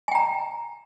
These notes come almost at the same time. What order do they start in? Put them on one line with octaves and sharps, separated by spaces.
G#5 G5 A#5